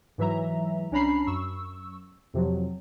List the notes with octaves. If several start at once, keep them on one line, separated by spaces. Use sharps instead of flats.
G#2 E3 F#3 E5 A#5
C2 C#4 D4 A#5 B5 C7
F#2 C#6 E6
F2 C3 F3 F#3